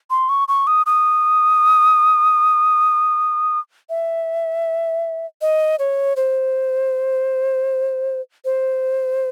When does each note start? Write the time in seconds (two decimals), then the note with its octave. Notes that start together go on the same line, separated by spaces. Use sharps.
0.10 C6
0.29 C#6
0.48 C#6
0.67 D#6
0.86 D#6
3.90 E5
5.41 D#5
5.79 C#5
6.16 C5
8.45 C5